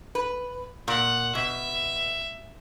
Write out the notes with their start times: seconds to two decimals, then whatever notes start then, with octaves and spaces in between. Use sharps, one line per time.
0.15 B4
0.88 A#2 F#5
1.35 B2 E5